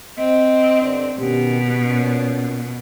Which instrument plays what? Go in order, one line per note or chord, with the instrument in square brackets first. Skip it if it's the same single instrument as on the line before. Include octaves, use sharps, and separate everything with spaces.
[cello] C4 [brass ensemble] D#5
[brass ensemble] G2 D3 D4
[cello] B2 [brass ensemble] D#3 C#4 G4
[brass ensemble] A#2 C#4